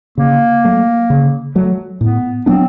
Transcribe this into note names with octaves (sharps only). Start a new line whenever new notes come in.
C#3 A#3
F#3 A3
C#3
F#3 A3
A2 B3
F#3 B3 C4 D4